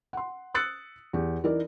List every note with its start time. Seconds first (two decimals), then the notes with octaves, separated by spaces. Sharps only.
0.13 F#5 C6
0.54 D#6 E6 F#6 A6 C#7
1.13 E2 G4
1.44 E3 D#4 A#4 D5